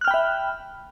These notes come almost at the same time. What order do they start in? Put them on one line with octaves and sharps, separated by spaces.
F#6 F6 G5 B5 E5